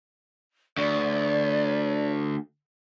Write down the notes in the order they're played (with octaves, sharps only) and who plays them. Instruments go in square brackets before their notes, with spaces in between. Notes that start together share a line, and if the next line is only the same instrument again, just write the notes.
[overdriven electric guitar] D2 [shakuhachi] D5